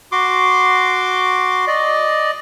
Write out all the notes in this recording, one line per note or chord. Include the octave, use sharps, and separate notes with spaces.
F#4 C6 D6
D5 D#5